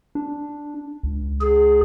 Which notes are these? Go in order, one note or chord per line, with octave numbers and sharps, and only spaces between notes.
D4
C#2
G#4